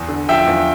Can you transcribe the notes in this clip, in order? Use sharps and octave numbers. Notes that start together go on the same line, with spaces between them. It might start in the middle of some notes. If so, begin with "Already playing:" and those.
Already playing: E2
D3
F3 E5 G5
E2